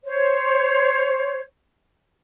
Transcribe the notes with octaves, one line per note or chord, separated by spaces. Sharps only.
C5 C#5